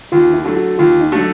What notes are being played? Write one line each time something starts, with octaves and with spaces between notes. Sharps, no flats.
D#2 F4
E4
D3 F#3 A3
F#4
D#2 F4
D#4
D3 F#3 A3